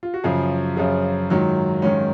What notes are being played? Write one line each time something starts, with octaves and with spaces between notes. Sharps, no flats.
F4
F#4
F#2 C#3 F3 G#4
F#2 C#3 F3 F4
G#2 D#3 F#3
G#2 D#3 F#3 C#4